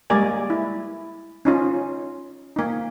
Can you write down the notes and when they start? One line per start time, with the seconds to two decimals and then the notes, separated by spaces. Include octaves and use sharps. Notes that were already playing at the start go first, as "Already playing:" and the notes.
0.10 G3 G#3 A#3 A#4 D5 G#5
0.50 E4
1.45 C#4 D#4 F4
2.56 A#3 D#4